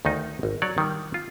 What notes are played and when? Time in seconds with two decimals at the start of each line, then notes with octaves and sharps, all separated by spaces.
0.05 D2 D#3 D#4
0.43 G#1
0.62 F#3 C#5 D5
0.78 D#3 G3
1.14 F4